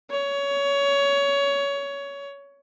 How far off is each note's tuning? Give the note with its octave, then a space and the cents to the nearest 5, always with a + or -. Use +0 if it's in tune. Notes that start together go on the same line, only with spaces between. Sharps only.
C#5 +20